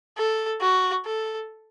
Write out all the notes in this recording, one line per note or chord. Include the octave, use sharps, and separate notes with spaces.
A4
F#4
A4